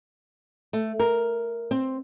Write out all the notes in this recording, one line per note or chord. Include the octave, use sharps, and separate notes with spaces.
A3
A#4
C4